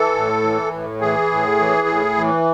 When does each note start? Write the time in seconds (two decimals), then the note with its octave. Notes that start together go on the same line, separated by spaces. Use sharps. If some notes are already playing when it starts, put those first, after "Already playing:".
Already playing: E3 A4
0.15 A2
0.43 E3
0.72 A2
1.01 E3 G#4
1.31 A2
1.59 E3
1.87 A2
2.17 E3